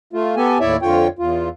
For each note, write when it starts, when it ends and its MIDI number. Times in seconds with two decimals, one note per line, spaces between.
0.13 0.35 57
0.13 0.35 65
0.36 0.58 59
0.36 0.58 67
0.36 0.58 69
0.36 0.58 80
0.61 0.76 39
0.61 0.76 45
0.61 0.76 64
0.61 0.76 73
0.61 0.76 74
0.61 0.76 76
0.82 1.08 41
0.82 1.08 50
0.82 1.08 65
0.82 1.08 73
0.82 1.08 79
1.19 1.49 40
1.19 1.49 65